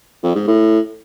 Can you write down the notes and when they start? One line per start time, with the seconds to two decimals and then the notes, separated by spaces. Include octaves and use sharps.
0.24 F2
0.35 G#2
0.47 A2